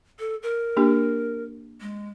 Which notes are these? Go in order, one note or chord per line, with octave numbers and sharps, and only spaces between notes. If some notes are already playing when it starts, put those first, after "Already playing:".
A4
A#4
A#3 D4 G4
G#3